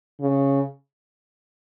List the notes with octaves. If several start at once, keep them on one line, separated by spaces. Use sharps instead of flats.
C#3